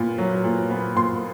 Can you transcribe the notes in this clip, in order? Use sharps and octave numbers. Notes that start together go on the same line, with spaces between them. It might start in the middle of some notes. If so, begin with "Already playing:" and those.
Already playing: A#2 B3
F#3
A#2
B3
A#2 C6